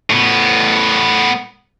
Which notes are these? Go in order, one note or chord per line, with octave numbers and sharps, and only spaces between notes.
A2 B3